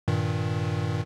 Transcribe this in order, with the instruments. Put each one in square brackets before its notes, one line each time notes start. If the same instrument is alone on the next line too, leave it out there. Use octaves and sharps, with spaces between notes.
[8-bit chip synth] G2 A#2 D#3